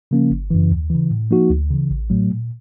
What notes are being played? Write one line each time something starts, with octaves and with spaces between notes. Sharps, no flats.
C#3 F3 A#3 C#4
G1
F#2 C#3 E3
D#2
C#3 E3
A2
F3 A#3 D#4 F#4
D2
C#3 E3
A1
A2 F#3 A3
A#2